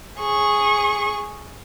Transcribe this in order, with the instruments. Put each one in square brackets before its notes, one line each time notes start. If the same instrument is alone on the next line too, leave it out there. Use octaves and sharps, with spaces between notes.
[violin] G#4 C#6